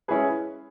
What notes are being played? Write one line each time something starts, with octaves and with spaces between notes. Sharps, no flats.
G#3 C#4 E4 G#4 B4